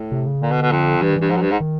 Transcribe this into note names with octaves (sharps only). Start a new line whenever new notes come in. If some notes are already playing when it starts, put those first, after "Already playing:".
Already playing: A2
C3
C#3
A#2 D3
B2
B2
F2
G2 E3
D#3
G2 E3
G#2 F3
F#2
G2
G#2
D#3